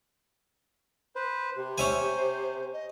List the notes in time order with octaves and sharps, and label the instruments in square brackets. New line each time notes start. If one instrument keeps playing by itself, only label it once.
[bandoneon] B4 C5
[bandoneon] C3 [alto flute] G4
[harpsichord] C#4 E5 G#5 [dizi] C5
[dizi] D#5